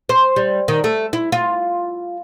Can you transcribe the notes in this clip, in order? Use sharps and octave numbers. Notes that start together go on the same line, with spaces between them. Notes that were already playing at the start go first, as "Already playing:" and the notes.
C5
G3
D#3
A3
E4
F4